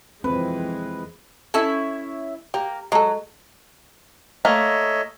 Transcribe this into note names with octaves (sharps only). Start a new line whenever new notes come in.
F2 E3 G#3 C4 B4
C#4 E4 A4 E5
A#3 G4
F#3 G#3 A4
A3 A#3 C#5 D#5 E5